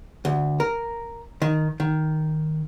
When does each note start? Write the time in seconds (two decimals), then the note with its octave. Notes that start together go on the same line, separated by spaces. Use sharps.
0.25 D2
0.60 A#4
1.42 D#3
1.80 D#3